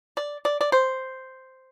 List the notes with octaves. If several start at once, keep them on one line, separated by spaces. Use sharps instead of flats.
D5
D5
D5
C5